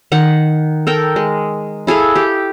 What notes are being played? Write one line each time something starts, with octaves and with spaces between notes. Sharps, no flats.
D#3 F#5
A4 A#4 G5
G#3
E4 G#4 A4 F5
G4